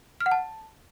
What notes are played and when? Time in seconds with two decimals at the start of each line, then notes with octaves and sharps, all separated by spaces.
0.21 F6
0.26 F#5
0.31 A5